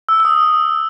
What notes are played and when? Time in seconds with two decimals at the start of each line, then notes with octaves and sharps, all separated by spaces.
0.09 E6
0.20 E6
0.25 D#6